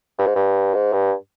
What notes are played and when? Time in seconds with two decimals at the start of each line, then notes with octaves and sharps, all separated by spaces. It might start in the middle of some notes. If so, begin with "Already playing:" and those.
0.19 G2
0.27 G#2
0.35 G2
0.74 G#2
0.93 G2